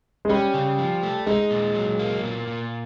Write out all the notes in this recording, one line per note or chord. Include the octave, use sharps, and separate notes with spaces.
G#3
G3 C#4
C#3
F3
A3
G#3 D#4
A#2
F#3
A#3
A#2
A#2